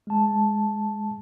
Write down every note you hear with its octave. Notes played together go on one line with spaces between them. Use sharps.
G#3 A5